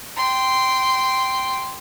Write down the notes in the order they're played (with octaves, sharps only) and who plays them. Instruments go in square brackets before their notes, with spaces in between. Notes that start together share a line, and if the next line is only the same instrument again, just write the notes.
[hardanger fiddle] G5 C6